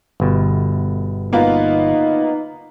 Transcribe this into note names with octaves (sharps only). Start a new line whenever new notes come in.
G1 B2
A#3 B3 D#4 F4